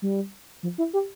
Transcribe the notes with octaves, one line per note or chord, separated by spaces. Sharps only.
G3
F3
E4
G4